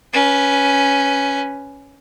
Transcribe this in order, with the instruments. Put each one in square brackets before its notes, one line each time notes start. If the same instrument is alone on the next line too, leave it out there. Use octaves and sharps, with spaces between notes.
[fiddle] C#4 B4